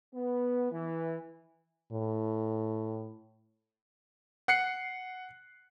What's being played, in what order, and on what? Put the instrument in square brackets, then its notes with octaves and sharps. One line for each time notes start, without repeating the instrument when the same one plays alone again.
[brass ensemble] B3
E3
[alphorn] A2
[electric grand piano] F#5 F#6 C7 C#7